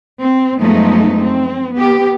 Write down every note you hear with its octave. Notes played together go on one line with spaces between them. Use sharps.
C4
F#2 F3 G#3 A3 B3 D#4
C4
B3 G4